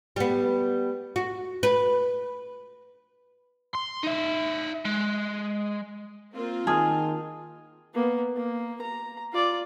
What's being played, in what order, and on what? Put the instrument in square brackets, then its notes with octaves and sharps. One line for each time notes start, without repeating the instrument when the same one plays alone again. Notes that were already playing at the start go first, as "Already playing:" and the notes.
[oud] G3 B3
F#4
B4
[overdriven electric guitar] C6
D#4 E5
G#3
[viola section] A#3 C4 F4
[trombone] D#3 [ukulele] G#4 [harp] A5 D#6 F6
[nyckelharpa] A#3 B3
A#3
A#5
F4 D5